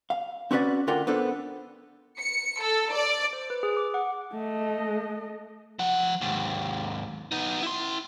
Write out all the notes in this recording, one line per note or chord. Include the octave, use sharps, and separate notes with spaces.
F5
C4 C#4 F#4 B4 C5 D5
D2 D3 F4 A#4 F#5 G5
B3 D4 A4 C5
C#7
A4
D5
C5
B4
G#4
D6
F#5
A3 D#5
F3 F#5
D#2 G#2
B3 D#4
E4 C6